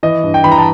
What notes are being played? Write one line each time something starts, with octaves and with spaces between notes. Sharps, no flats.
E3 D#5
G2
G5
E3 B5
A#5
A5